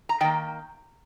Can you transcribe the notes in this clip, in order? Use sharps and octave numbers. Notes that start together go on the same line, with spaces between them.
A#5
D#3 A#3 G5